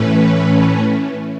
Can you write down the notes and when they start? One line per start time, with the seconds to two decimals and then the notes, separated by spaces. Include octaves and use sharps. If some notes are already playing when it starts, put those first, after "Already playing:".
Already playing: A2 E3 A3 C#4 B4